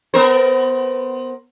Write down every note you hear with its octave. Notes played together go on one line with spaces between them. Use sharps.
B3 A#4 C5